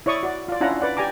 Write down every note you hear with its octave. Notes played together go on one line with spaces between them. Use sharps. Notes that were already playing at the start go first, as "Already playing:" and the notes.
E4 C#5 D5 C#6 D#6
F#4 D5
F4 D5
C#4 D4 E4 F4 F#5 A#5
B4 D5 F#5
G4 D5 G#5 A#5 D6